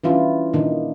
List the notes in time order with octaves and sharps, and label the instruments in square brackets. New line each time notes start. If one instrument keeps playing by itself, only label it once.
[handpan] E3 G3 C#4 D4 E4 F4
A#2 D#3 D4 D#4